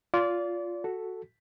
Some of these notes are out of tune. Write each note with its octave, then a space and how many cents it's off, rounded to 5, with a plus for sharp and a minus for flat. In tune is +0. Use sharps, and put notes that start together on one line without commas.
F4 +0 D5 -30
F#4 +0 A4 +0